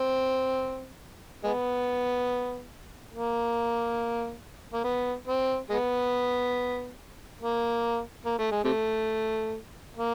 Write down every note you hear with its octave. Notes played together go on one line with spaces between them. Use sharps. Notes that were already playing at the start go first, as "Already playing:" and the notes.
Already playing: C4
G#3 B3
A#3
A#3
B3
C4
G#3 B3
A#3
A#3
A3
G#3
C3 A3
A#3